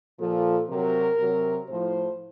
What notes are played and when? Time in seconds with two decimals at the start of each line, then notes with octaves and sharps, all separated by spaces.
0.18 A#2 F3 A4
0.68 C3 F#3 A#4
1.18 C3 F#3
1.69 A2 F3 C5